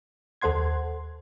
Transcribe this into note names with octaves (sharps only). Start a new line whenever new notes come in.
D#2 A4 C5 F#5 C6 G#6